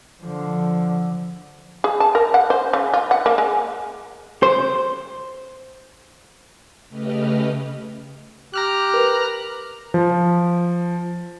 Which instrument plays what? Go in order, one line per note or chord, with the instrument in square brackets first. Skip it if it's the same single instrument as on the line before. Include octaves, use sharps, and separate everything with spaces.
[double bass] D3 F3
[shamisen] G#4
A5
A#4
F#5
C5
C#3
F4
F#5
A#3
G#3
[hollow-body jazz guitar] C5
[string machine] C#3 A3 G4 B4 D#5 F6
[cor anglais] G4 [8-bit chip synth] A#5 F6 F#6
[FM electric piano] A#4 B4
[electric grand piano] F3